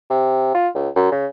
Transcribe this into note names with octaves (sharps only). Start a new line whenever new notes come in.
C3
F4
C#2
F#2
C#3